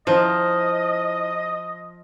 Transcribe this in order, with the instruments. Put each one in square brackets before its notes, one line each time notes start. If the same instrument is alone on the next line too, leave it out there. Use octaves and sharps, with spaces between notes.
[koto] F3 [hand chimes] E4 [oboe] D#5